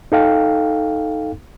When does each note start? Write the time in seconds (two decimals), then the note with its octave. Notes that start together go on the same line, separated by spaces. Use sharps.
0.12 D#4 A4 F5 G5